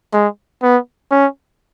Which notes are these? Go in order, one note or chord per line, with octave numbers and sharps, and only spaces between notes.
G#3
B3
C#4